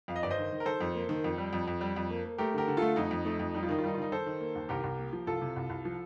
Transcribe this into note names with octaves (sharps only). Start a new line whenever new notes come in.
F2 F5
D#5
G1 D5
C5 D#5
D#3
D#3
A#4
D#3 A4 C5
F2
A#3
D#3
F2
G3
F2
F2
G3
F2
A#3
A#3
A3 G4 A#4
D3 G4 A#4
D3
A3 F4 A4
F2 D#4
F2
A3 D#4
F2
G3 D#4
F4
D#3 D#4
F4
G3 D#4
F4
D#3 D#4
D#3 A4 C5
D#3
A#3
D#2
C2 G4 A#4
C2
A#3
F3
C2 F4 A4
C3
C2
C2
F3